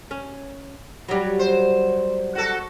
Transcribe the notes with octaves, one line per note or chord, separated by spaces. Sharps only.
C#4
F#3 G3
C5
F#4 A4